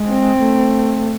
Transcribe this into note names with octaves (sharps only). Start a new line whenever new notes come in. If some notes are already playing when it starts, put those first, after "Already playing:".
Already playing: G#3
C4
A3